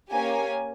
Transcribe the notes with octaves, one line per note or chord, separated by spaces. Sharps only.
A#3 C#4 G4 G#5